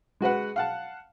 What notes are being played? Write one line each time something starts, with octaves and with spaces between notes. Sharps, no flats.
G#3 F#4 B4 F#5
F5 F#5 A5